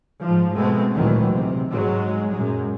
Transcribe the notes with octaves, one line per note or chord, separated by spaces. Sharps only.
G#2 F3
B2 G#3 A3 B3 C4
D2 A#2 D#3 E3 F#3
C3
G#2 F#3 G#3
F#2 A#2 G#3